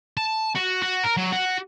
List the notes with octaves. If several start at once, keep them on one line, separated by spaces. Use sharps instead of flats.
A5
F#4
F#4
A#4
F#3
F#4